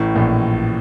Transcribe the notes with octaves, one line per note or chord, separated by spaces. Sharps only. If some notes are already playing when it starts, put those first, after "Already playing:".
Already playing: A1 A2
A#1 A#2